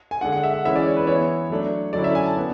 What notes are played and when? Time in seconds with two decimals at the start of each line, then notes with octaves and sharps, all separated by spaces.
0.11 G#5
0.21 D3 G#3 D4 F#5
0.32 F#5
0.43 E5
0.53 F#5
0.65 E3 G#3 C#4 E4 E5
0.76 D5
0.87 C#5
0.96 B4
1.07 E3 B3 E4 C#5
1.50 F#3 A3 D4
1.93 D3 F#3 C#4 E4 D5
2.04 E5
2.15 G#5
2.26 A5
2.37 B3 D4